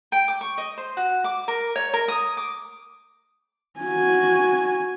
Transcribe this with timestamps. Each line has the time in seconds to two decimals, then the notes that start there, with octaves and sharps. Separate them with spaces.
0.12 G5
0.28 D6
0.41 C#6
0.58 D#5
0.78 C5
0.97 F#4
1.24 D6
1.48 A#4
1.76 C#5
1.94 A#4
2.08 D#6
2.37 D6
3.80 F#4 G#5